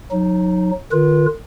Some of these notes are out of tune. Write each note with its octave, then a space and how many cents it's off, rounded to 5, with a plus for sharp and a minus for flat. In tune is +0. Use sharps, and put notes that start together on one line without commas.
F#3 -25 D#4 +0
D3 +45 F4 +0 B4 -35